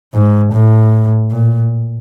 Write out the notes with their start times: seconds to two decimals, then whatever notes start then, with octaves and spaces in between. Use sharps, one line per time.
0.14 G#2
0.53 A2
1.31 A#2